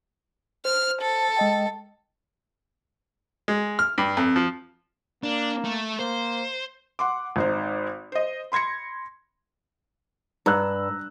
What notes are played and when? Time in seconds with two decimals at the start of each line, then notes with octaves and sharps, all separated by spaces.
0.65 C5 F6
1.02 A4
1.37 G#3 D#5 G5
3.48 G#3
3.79 F6
3.98 G2
4.17 F2
4.36 F3
5.23 A#3 D4
5.65 A3
5.99 A#3 C5
6.99 F#5 C6 D6
7.36 G#1 D#4 C5
8.12 C5 D#5
8.52 B5 C6 G#6 A#6 C#7
10.46 G2 A#5 E6 F#6